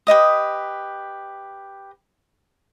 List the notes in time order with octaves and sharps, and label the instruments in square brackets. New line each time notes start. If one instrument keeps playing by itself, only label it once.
[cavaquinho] G4 B4 D#5 D#6